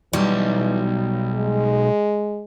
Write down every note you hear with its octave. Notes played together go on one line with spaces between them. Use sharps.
B1 E3 G3
G#3